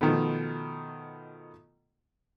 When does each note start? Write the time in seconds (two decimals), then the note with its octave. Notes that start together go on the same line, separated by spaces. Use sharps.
0.01 B2 D#3 F3 A3 B3